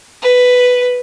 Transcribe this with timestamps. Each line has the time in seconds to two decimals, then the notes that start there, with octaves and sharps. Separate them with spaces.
0.23 B4